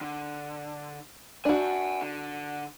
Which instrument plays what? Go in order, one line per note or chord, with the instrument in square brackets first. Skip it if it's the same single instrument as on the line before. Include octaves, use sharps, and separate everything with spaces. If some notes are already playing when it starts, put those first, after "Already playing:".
[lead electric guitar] D3
[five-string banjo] D4 F#4 [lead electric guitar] F#5 G#5
[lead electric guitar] D3